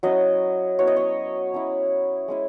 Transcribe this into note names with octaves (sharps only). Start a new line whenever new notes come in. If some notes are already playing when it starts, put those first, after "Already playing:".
F#3 C#4 E4 D#5
F#3 B3 E4 C#5
D#5
C#5
F#3 C#4 E4
G#3 C#4 E4